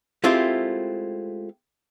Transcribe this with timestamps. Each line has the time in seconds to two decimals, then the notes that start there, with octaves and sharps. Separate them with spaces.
0.24 G#3 A3 C4 E4 F4 G4